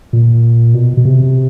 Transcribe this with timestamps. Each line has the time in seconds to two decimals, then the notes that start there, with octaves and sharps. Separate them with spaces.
0.13 A#2
0.74 B2
0.97 B2
1.05 C3